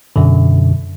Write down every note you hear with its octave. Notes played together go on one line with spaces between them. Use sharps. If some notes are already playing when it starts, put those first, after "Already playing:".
F#2 B2 D3